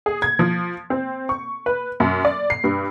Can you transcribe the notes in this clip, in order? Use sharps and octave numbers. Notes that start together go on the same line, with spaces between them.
G#4
G#6
F3
C4
C#6
B4
F#2
D5
C7
G2